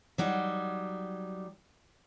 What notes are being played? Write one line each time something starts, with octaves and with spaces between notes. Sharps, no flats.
F#3 G3 D#4